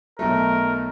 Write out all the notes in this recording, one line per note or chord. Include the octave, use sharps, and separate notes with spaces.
B1 A3 A#4